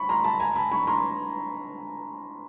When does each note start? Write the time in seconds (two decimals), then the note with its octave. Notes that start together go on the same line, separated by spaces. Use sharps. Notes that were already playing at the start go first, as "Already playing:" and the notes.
Already playing: B5 C#6
0.09 A#5 C6
0.24 A5 B5
0.40 G#5 A#5
0.56 A5 B5
0.72 B5 C#6
0.87 A#5 C6